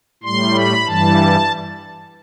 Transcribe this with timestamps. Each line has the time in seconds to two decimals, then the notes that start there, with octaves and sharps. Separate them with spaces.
0.23 A2 G3 C6
0.54 B5
0.86 G2 E3 G3 A5